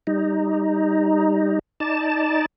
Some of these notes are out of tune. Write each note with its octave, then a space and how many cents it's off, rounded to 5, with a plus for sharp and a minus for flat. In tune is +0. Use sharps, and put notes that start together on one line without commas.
G3 +5 D#4 +0
D#4 +5 D5 +0 A5 +0